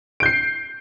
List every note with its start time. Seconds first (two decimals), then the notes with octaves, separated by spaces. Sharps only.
0.20 D7
0.23 G6
0.26 C7